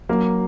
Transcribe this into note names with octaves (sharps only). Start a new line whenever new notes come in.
F#3 A#3